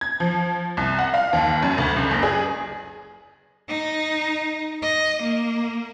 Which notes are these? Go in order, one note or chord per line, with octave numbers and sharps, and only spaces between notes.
G#6
F3
C2
F#5
F5
D#2
F#2
D2
C#2
F#1
G#4
D#4
D#5
A#3